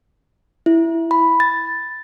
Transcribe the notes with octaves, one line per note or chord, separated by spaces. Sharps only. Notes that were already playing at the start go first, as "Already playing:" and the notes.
E4
B5
A6